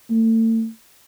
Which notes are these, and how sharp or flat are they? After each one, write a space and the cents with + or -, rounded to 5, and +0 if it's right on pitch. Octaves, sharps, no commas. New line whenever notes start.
A3 +40